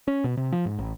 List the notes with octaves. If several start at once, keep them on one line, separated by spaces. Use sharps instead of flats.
C#4
B2
C3
F3
G#2
A1